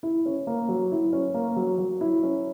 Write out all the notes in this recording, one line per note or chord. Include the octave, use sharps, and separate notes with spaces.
E4
C#4
A#3
F#3
E4
C#4
A#3
F#3
F#3
E4
C#4